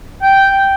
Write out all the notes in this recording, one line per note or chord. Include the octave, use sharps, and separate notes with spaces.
G5